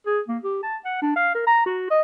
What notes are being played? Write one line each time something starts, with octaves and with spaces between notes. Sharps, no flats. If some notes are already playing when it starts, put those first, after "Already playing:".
G#4
A#3
G4
A5
F#5
D4
F5
A#4
A#5
F#4
D#5